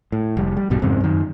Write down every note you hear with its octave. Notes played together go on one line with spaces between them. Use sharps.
A2
F1 G3
G3
B1 G2 B2 G3
F2 G#2 C#3 C4
F#2 D#3